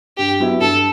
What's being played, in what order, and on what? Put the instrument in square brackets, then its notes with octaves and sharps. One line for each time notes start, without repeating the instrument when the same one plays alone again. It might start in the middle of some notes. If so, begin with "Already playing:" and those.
[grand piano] G2 [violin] G4
[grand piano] F#3 B3 E4
[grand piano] G2 [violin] A4